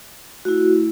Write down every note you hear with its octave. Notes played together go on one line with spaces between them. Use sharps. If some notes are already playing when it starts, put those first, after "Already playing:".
A3 E4 F#4